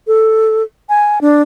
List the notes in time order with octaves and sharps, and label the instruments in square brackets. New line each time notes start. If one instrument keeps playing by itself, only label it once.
[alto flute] A4
G#5
D4